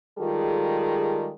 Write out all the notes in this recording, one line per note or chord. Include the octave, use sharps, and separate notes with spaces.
D#3 G3 G#3 F4 G#4 A4